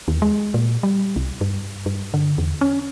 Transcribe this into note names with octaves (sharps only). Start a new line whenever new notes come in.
D#2
G#3
A#2
G3
C2
G2
G2
D3
E2
C#4